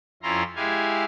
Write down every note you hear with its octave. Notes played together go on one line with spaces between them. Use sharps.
F2 C#4 E4 F4 A#5 C6
G#3 E4 G4 F5 G#5